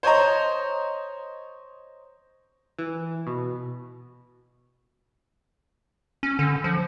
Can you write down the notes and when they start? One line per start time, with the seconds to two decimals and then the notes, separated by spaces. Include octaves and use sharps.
0.03 C5 C#5 D#5 A#5
2.79 E3
3.27 B2
6.23 C#4
6.39 D3
6.64 F3